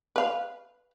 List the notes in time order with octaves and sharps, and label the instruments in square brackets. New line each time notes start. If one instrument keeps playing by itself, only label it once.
[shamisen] B4 F5